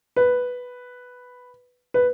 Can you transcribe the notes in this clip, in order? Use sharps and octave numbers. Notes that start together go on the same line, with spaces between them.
B4
B4